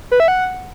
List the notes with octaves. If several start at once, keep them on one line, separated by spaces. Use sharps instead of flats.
B4
E5
F#5